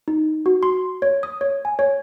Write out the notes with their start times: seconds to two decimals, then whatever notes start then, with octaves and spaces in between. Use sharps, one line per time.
0.08 D#4
0.46 F#4
0.63 C6
1.02 C#5
1.23 D#6
1.41 C#5
1.65 G#5
1.79 C#5